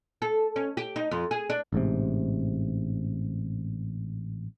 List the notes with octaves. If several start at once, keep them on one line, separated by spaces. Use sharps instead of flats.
A4
C#4
G4
D#4
F2
G#4
D4
A1 G#2 C3